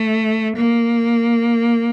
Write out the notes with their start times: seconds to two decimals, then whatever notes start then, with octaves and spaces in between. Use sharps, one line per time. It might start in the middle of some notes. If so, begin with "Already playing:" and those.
Already playing: A3
0.56 A#3